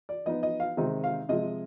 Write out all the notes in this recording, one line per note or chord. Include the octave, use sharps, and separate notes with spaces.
D5
F3 B3 D#4 D#5
D#5
F5
C3 D#3 G#3 C4 D#4
F5
C3 F3 G#3 D#5